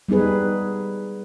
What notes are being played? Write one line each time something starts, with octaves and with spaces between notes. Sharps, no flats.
G3 B3 D#4 G#4 B4